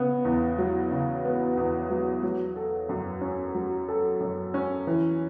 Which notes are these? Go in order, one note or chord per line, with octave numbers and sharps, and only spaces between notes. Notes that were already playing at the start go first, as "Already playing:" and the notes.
Already playing: C#3 B3
E2
F#3
C#3
B3
E2
F#3
F#3
A4
F#2
C#4
F#3
A4
F#2
C#4
E3